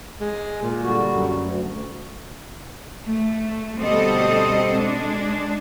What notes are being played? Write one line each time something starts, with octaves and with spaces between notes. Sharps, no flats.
G#3
A#2
D3 G3 F#4
F#2
D2
A3
D2 B2 G3 C4 A4 D#5
G#3 D4